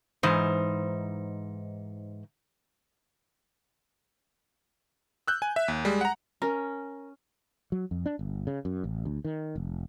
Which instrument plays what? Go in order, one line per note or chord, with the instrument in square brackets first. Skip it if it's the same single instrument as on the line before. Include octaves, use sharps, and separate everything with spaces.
[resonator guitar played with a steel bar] G#2 E3 D#4 C5
[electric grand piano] E6 F#6 G6
G#5
E5
D#2
G3 G#3
F#5 A#5
[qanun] C#4 [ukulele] A#4
[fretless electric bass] F#3
F2
D4
G1
C#3
F#2
A1
D2
D#3
F1